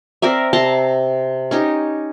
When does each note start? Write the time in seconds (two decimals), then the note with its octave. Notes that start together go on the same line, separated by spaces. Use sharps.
0.22 C4 A#4 D5 E5
0.53 C3 A5 A#5 C6
1.51 C#4 D#4 G4